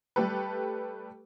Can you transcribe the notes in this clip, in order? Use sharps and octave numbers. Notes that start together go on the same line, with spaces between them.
G3 A3 G4 A4 B4